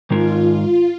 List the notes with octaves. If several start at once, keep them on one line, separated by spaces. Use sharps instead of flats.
G#2 D#3 G#3 D#4 F4 A#4
F4